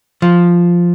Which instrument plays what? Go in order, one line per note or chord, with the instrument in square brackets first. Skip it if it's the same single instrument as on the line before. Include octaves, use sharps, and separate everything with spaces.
[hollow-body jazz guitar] F3